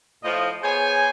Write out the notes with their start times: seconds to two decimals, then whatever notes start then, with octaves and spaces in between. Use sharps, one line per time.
0.23 A2 F3 D#5
0.63 B3 G#4 C5 C#5 G#5